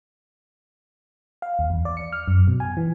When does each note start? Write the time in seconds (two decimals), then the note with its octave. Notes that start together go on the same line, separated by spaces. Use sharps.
1.42 F5
1.59 D#2
1.70 E2
1.85 D5
1.97 C#7
2.13 F6
2.28 F#2
2.48 B2
2.60 G#5
2.77 E3